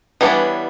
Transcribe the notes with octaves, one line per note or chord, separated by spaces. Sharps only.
E3 G3 B3 D4 C#5